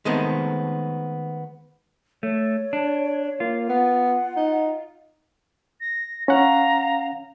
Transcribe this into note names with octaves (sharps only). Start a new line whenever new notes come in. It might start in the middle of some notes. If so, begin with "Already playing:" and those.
D#3 G#3 A3 B3 C4
A3 C#5
D4
A#3 F4
B3 F#5
D#4
A#6
C#4 F5 F#5 A#5